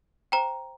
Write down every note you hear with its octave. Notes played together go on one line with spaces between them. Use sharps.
C5 G5 A#5